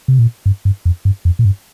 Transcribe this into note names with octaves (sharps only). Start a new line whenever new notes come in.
C3
A#2
G2
G2
F2
G2
F2
A#2
G2